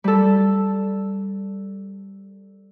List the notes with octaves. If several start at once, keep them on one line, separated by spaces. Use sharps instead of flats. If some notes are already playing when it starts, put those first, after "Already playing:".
G3 A4